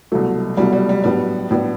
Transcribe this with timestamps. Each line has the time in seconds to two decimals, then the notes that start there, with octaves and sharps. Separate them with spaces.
0.12 C2 B2 F#3 A3
0.57 C2 B2 F#3 G3 A3
0.73 G3
0.89 G3
1.03 A2 F#3 G3 B3 D4
1.51 A2 F#3 B3 D4